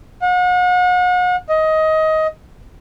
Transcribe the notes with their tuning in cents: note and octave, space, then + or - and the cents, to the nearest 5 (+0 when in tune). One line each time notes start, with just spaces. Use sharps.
F#5 -40
D#5 +20